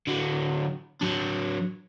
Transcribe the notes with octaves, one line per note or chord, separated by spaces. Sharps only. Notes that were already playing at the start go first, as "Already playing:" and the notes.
D3 F#3
F#3 D4